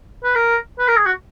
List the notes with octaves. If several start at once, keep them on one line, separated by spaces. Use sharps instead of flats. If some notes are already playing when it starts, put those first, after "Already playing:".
B4
A#4
B4
A#4
G#4
F#4